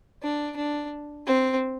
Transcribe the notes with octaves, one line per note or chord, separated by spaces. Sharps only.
D4
D4
C4